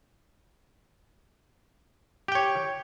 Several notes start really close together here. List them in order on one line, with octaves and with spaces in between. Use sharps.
G4 G5 C#5